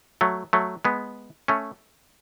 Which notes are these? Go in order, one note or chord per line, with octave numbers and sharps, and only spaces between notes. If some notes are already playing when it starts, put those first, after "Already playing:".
F#3 A3
F#3 A3
G#3 B3
A3 C#4